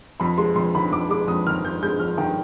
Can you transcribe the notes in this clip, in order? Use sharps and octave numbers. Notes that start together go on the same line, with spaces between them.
F2 B5
G#3 C6
F2 C6
D#3 B5
F2 D6
G#3 D6
F2 D#6
D#3 F6
F2 G6
G#3 G6
F2 F6
D#3 G5